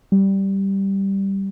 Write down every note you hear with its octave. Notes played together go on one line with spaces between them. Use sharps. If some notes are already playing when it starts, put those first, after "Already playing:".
G3